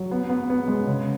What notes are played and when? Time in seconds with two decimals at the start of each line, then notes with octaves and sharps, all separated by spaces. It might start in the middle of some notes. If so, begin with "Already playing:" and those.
Already playing: F#3
0.11 B3
0.30 B3
0.50 B3
0.68 G#3
0.87 C#3